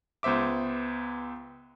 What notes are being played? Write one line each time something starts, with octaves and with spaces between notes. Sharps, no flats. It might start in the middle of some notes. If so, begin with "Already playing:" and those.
C#2 B3 C5 E5 D6